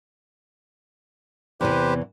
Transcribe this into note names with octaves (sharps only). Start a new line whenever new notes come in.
E2 C3 E3 G4 B4 C5